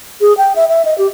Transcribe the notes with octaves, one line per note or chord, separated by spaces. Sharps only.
G#4
G5
E5
E5
D#5
G4